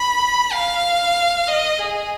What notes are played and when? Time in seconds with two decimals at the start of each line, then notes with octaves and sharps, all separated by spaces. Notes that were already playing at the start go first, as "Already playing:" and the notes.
Already playing: B5
0.52 F5
1.48 D#5
1.79 G#4